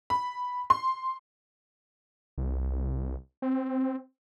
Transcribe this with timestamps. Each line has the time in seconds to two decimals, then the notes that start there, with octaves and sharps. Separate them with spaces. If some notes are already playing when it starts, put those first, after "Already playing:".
0.10 B5
0.70 C6
2.38 C2
3.42 C4